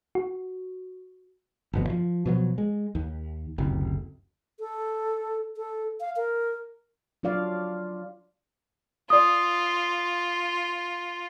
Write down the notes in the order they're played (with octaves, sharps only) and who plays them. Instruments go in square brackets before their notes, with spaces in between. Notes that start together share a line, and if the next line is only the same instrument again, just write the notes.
[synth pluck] F#4
[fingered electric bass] G1 F2 B2
F3
B2 F3 F#3
G#3
D#2
F#1 D2 C3
[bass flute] A4
A4
F5
A#4
[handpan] F#3 D4 F4 D5 F5
[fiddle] F4 [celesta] D5 D#6